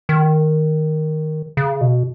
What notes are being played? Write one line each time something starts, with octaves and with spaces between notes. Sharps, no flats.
D#3
C#3
B2